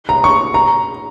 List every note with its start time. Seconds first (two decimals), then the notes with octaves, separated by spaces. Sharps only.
0.09 A#5
0.24 C#6
0.54 A#5